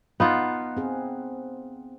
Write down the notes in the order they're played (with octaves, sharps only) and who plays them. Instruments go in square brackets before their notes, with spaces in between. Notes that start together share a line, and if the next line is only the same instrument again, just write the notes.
[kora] B3 D#4 F4 [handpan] F5 F#5
[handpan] C4 G#4